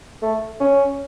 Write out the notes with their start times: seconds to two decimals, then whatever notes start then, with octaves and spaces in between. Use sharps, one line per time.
0.22 A3
0.60 C#4